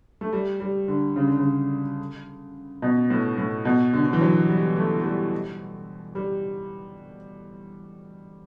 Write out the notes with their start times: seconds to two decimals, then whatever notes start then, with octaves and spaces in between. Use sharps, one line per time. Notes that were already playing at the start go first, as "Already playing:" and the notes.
0.21 A3
0.33 G3
0.60 G3
0.88 D3
1.16 C#3
1.28 D3
1.39 C#3
2.82 B2
3.10 A2
3.38 A2
3.65 B2
3.93 D3
4.05 D3
4.13 E3
4.21 F#3
4.49 G3
4.76 A3
5.00 A3
5.04 G3
6.15 G3